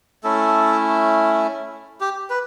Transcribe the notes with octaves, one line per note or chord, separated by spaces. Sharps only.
A3 C#4 E4 A4
G4
B4